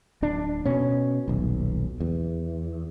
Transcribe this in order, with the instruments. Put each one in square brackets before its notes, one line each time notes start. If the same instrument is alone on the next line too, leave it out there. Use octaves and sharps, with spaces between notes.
[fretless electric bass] D1 D4
B2 C#4
D#1 B1
E2